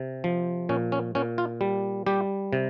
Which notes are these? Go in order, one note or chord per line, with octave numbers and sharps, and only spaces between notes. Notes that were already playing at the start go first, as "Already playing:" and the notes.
Already playing: C3
F3
A#2 C#4
C#4
A#2 C#4
F4
G3
G3 G4
C3